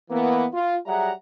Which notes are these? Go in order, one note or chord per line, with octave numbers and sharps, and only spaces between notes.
E3 A#3 B3
F4
F#3 G3 G#4 E5 F#5 A#5